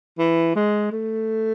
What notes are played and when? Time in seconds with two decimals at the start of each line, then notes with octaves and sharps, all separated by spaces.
0.18 E3
0.55 G#3
0.91 A3